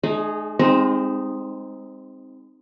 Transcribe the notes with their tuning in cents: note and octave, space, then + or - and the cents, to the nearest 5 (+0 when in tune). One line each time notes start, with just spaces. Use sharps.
G#3 +45 D#4 -30 G#4 +0
G#3 -30 C4 +0 D#4 +0